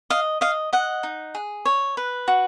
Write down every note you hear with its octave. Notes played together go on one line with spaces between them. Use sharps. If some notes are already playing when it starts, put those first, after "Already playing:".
D#5 F5
D#5 F5
D#5 F#5
D#4
G#4
C#5
B4
F#4